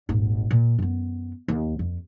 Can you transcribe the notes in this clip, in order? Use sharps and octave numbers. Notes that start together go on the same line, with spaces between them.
D#1 G#1
A#2
F#2 B3
D#2
F2